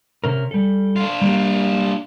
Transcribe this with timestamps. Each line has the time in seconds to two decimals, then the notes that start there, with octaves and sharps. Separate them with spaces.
0.24 C3 C#4 A#4
0.51 G3 A4
0.96 D4 F4
1.22 G3 A#3 G4